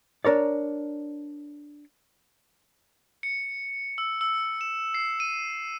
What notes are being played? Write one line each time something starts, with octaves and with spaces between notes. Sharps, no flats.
D4 A#4 C#5 D5
C#7
E6
E6
E7
C7
D#7